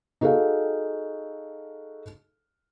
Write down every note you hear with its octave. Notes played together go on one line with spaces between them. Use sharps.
D#4 F#4 G#4 A4 F5